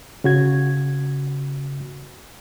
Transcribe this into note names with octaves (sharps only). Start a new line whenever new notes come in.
C#3 F#4 G#6